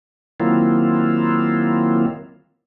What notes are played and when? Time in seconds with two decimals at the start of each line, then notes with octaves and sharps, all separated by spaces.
0.40 D#3 F#3 A#3 C4 E4 F4